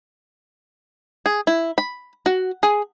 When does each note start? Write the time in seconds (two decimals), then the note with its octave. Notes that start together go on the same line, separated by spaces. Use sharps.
1.26 G#4
1.47 E4
1.78 B5
2.26 F#4
2.63 G#4